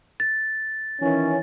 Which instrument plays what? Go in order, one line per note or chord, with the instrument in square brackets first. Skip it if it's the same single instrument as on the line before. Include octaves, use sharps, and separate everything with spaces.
[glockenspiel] A6
[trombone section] D#3 E3 C#4